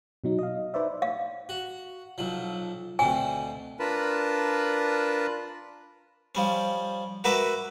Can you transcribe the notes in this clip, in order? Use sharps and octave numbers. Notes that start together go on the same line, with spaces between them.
B2 F#3 D#4
D#5 F5
D#4 B4 C5 D5 E5
F5
F#4
B1 F3
D2 B2 C4 G#5
D4 F4 A#4 B4 A5 B5
F3 G3 C#4
F#4 A#4 B4 E5 D6